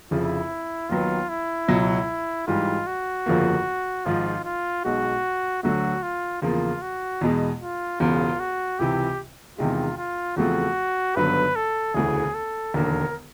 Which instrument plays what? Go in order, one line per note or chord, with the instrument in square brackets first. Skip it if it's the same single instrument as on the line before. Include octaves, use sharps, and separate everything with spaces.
[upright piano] F1 F2 C#3 F3 [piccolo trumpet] E4
[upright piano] D#2 D#3 F#3 B3 [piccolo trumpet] F4
[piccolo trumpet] E4
[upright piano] C#2 B2 F#3
[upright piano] G#2 E3 G3 [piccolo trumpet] F4
[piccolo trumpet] F#4
[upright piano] G1 F2 C#3 F3 A#3
[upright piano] G#1 G#2 F3 G#3 [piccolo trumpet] F4
[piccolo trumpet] F4
[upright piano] B1 B2 G#3 [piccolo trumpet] F#4
[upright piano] D2 D3 F#3 A3 [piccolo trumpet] F#4
[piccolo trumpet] F4
[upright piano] E2 C#3 F3 A#3 [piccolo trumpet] F4
[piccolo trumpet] F#4
[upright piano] E2 B2 G#3
[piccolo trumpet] F4
[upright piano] E1 E2 C#3 [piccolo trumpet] F4
[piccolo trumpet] F#4
[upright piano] C#2 C3 E3 [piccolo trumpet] G4
[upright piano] E2 C3 D#3 G#3 [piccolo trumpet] F4
[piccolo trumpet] F4
[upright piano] E2 C#3 F3 A3 C4 [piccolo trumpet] F#4
[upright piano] G#1 G2 D3 F#3 B3 [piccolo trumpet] B4
[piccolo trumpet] A4
[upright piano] E1 D2 C#3 E3 A3 [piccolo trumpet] G#4
[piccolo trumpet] A4
[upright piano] E1 D#2 D3 [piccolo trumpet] A#4